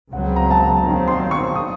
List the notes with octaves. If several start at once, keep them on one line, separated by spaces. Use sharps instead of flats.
C#2 C#3 F#3 C4 F#5
A#5
A5
A#5
D#2 D#3 F#3 C4 A#5
C6
C#6
D#6